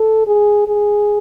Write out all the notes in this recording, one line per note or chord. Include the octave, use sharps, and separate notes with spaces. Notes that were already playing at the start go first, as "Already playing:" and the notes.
Already playing: A4
G#4
G#4